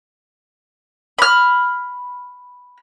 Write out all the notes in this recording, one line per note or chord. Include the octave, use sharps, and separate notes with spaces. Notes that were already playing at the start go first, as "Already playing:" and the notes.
B5 F6